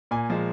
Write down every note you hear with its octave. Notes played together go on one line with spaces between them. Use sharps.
A#2 G#5
F3 G#3